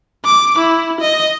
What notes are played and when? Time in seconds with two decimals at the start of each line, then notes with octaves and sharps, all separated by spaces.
0.24 D6
0.59 E4
1.01 D#5